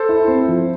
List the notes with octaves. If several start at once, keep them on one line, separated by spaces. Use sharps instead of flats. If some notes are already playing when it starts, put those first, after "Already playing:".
Already playing: A4 C5
E4
C4
F3